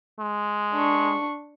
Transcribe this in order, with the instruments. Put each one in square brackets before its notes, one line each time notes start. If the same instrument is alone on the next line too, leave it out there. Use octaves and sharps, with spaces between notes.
[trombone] G#3
[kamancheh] D4 C#6